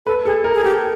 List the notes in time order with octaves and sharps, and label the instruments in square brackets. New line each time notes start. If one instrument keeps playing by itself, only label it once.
[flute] A4 [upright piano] B4
[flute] G#4 [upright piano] A4
[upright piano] A#4
[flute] G#4
[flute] G4 [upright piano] A4